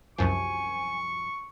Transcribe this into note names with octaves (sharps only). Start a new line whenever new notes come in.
C2 F#2 F3 G#5 C#6